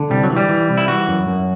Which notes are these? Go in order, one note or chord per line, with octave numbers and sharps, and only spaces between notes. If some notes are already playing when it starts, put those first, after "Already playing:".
Already playing: D3
C2 G3
F#3
E3
G3
E3
C2
E4
E3 F#4
F#2
F#2